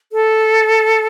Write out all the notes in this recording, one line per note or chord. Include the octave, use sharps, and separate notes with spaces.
A4